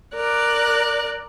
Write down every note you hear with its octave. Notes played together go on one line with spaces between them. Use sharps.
A#4 D5 F#6